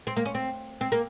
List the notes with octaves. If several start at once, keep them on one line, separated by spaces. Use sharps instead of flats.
C4
A#3
C#4
C4
C4
A#3